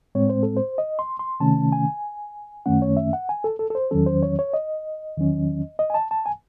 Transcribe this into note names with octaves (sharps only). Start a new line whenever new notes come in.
A2 G#3 C4 C#5
C5
A4
C5
D#5
C6
C6
C3 D#3 A3 C#4 A5
G#5
F#2 D#3 A3 C#4 F#5
C#5
E5
F#5
G#5
A4
A4
A4
C5
E2 D#3 F#3 C#4 A4
C5
C#5
C#5
D#5
E2 D#3 F#3 C#4
D#5
G#5
A5
A5
G#5